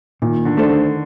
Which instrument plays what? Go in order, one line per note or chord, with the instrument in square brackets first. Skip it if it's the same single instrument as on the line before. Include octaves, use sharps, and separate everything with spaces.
[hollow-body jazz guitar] A#2 [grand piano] D#3
[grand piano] D3
[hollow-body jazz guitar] A3 D4 A4 C5
[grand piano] D3